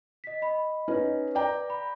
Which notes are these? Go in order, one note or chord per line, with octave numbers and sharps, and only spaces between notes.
D#5 B6
D#5 B5
C#4 D#4 B4 D#5
D5 G5 A#5
B5